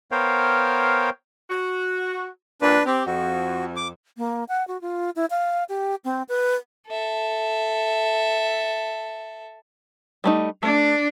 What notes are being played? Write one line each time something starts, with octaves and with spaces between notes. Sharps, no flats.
B3 A#4 C5 C#5 F5 G5
F#4
G2 A#2 D4 B4
C4 G4
F2 F#4
D6
A#3
F#5
F#4
F4
E4
F5
G4
C4
B4
A4 E5
G3 A3 D#4
A3 D4